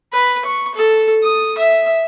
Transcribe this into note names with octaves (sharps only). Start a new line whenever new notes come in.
B4
C#6
A4
D#6
E5